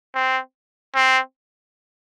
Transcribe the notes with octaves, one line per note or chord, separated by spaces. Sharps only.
C4
C4